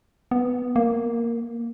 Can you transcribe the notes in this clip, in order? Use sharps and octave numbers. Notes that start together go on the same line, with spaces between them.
B3
A#3